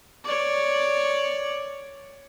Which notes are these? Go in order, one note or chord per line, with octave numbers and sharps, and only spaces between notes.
C#5 D5